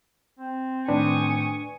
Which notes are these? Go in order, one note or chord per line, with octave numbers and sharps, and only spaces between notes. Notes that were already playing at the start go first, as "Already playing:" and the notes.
C4
A2 D#3 D4 B4 G#5 C#6 D#6